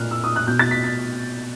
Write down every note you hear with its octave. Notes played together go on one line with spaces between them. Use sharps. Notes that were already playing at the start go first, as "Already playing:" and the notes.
Already playing: A#2 F6 F#6
E6
D#6
F#6
B2 G6
A6
B6
B6